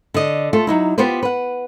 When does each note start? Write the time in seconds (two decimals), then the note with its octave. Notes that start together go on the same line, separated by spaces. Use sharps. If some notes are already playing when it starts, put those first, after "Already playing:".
0.14 D3 D#5
0.53 A3 F4 A4
0.67 F#3 D#4 E4
0.98 B3 F4 G4 B4 C5
1.23 B4 F#5